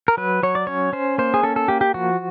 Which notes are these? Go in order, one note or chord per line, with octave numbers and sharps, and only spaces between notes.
A#4
F#3 B4
F#3 C#5
D5
C#4 C#5
C#4 C5
A#3 C5
G#4
C#4 A4
A4
A#3 G4
G4
F3 F#4